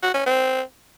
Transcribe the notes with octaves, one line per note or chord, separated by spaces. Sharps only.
F#4
C#4
C4